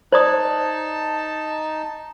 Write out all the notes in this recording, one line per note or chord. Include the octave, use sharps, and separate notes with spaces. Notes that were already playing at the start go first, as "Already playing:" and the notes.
D#4 C5 D5 A5 D#6